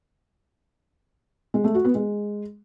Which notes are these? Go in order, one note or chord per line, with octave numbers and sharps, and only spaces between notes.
G#3
A3
F#4
B3
G#3